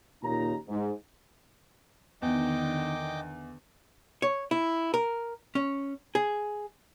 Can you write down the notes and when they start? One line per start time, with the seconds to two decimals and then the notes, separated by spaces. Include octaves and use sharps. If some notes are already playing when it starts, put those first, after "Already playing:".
0.23 D#2 A#2 C#3 D#4 A#5
0.68 G#2
2.22 E2 D3 D#3 D#5 G5 D6
4.22 C#5
4.51 E4
4.94 A#4
5.55 C#4
6.15 G#4